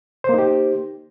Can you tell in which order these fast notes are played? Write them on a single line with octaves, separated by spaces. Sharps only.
C5 A#3 D#4 G4